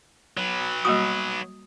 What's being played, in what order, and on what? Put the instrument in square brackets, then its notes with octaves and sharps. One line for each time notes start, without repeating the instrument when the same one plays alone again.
[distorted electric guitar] F#3 B4
[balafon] G3 A#3 F#4 [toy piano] D#6